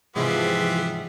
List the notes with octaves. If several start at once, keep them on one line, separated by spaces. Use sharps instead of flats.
G#2 C3 E3 F3 G3 B3 C4 G#4